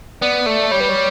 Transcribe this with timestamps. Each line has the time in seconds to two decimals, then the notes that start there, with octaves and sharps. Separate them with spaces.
0.21 B3 D5
0.46 A3
0.70 G3 C#5
0.80 B4
0.89 C#5